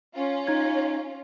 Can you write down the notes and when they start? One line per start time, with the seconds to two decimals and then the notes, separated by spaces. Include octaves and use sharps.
0.14 C#4 F4
0.47 D#4 G#6